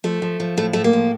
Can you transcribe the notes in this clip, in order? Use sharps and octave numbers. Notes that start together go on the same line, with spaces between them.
F3 A3
F3
F3
A2 A3
A2 A3
A#3
F3